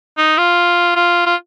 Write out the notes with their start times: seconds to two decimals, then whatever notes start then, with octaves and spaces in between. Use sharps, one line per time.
0.18 D#4
0.38 F4
0.96 F4
1.26 F4